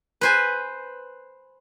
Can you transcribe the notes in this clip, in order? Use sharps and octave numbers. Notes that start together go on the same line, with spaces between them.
B4 C5 G#5